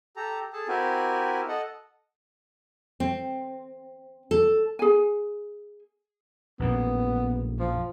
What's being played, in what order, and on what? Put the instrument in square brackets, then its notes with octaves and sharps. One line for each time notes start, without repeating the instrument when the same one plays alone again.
[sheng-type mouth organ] G4 A4 A#5
G#4 A4 A5
C4 E4 F#4 G4 A#4 G#5
A4 D#5 F#5
[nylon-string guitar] C4
A4
[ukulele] G#4 G#5
[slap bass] A#1 F#2 A2 [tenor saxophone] B3
[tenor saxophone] F3